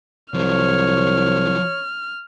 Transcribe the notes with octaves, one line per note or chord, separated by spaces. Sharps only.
C2 F3 F#3 C#5 F6